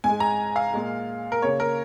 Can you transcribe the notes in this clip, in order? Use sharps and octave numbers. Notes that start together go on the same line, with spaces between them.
G#2 G#3 G#5
A#5
F5
A#2 G#3
A#4
C#3 A#3 C#5
A#4